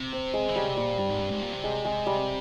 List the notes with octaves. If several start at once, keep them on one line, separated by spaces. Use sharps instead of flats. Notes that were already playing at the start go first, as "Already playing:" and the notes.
Already playing: C3
C4
G#3
E3
C#3 G3
C3
A#2 G3
G2 G3
G#2
G2
G#2
A#2
C3
G#3
G#3
G3